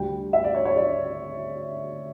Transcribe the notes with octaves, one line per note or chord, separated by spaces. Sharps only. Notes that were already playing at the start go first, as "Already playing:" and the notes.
Already playing: D2 D3 G3 G5
E5
D5
C#5
C#5
D5